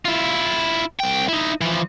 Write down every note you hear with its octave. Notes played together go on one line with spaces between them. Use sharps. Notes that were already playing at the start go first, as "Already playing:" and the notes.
E4 F4
C2 G5
D#4 E4
E3 F3